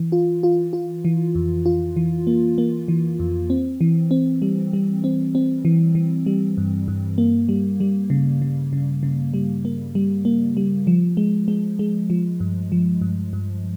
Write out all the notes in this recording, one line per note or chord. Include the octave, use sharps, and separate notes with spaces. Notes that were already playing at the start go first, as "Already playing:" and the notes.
Already playing: E3
F4
F4
F4
E3
F2
F4
E3
A#3
A#3
E3
F2
C4
E3
C4
G3
G3
C4
C4
E3
E3
G3
G2
G2
A#3
G3
G3
C#3
C#3
C#3
C#3
G3
A#3
G3
A#3
G3
F3
G#3
G#3
G#3
F3
G2
F3
G2
G2